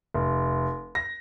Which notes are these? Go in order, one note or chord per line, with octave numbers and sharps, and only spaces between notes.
F1
A#6